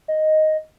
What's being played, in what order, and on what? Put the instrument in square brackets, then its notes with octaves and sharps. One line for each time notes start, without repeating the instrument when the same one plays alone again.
[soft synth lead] D#5